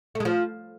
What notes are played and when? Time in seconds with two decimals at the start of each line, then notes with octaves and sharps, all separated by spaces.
0.15 A3
0.20 G#3
0.25 F3